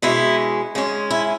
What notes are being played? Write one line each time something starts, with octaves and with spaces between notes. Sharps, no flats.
B2 G#3 C#4 E4
G#2 G#3 C#4
E4